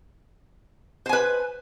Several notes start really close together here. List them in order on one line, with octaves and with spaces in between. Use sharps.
C5 G#5 B4